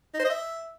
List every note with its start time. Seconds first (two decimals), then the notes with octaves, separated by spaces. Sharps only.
0.14 D#4
0.19 C5
0.25 D#5
0.30 E5